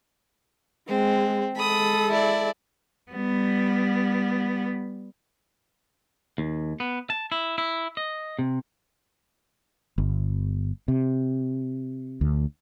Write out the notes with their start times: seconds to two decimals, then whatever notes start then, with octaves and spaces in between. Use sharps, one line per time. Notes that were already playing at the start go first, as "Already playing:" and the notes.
0.89 G#3 C4
1.56 G#3 A4 B5 D#6
2.10 E4 D5
3.12 G3 B3
6.38 D#2
6.80 B3
7.10 A5
7.32 E4
7.58 E4
7.97 D#5
8.39 C3
9.98 G1
10.88 C3
12.21 D2